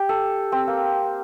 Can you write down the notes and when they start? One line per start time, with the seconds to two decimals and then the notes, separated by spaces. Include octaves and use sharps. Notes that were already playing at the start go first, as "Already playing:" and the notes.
Already playing: G4
0.09 A4
0.52 C4
0.67 A#3